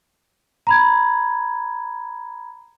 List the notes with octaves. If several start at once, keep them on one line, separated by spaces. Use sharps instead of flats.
A#5 B5 G#6